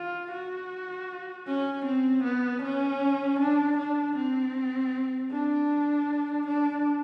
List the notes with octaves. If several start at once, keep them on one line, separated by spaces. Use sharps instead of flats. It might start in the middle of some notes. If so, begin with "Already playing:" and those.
Already playing: F4
F#4
C#4
C4
B3
C#4
D4
D4
C4
D4
D4